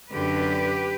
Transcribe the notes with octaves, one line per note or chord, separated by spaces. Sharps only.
F#2 D3 G4 B4